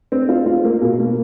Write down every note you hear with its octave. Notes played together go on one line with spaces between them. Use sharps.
C4
F4
F4
A#3
B2
A#3